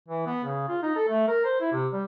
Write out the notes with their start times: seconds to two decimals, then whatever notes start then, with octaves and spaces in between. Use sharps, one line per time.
0.09 E3
0.27 B3
0.45 C#3
0.69 F4
0.83 D#4
0.97 A4
1.09 A3
1.28 A#4
1.45 C5
1.61 E4
1.73 C3
1.93 G3